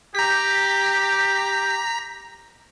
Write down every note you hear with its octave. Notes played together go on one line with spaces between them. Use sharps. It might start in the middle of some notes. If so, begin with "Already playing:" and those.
G4 A#5 B6